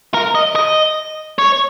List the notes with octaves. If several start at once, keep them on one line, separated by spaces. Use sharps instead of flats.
A#4
D#5
D#5
C#5